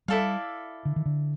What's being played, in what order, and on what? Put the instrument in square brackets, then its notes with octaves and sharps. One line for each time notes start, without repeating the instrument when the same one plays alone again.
[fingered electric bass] G3 [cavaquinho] E4 A4 D5 F5
[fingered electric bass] D3
D#3
D3